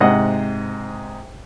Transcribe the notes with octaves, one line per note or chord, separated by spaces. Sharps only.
G#2 C3 D#5 F#5